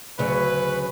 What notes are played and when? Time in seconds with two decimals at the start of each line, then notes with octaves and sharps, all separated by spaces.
0.19 D2 C#3 F#3 B4